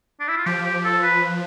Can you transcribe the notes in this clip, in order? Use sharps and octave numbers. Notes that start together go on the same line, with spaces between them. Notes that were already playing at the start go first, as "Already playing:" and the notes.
D4
E4
F4
F3 G4
G4
A4
B4